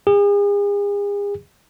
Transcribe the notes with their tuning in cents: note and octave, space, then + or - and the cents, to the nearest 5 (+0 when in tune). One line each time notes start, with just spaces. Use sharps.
G#4 -40